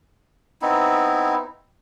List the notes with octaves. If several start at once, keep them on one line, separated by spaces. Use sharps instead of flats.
B3 C4 D#4 E4